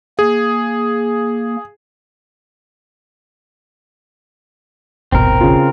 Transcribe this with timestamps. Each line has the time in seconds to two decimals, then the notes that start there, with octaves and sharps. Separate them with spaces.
0.19 A#3 G#4
5.12 D#1 G#1 B2 C4 A#4
5.41 C#3 F4